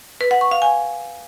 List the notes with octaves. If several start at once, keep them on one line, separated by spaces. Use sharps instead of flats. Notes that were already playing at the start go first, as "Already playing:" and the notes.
B4
F#5
C#6
F5
G#5